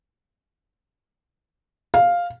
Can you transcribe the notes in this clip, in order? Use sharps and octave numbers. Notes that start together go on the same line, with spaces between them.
F5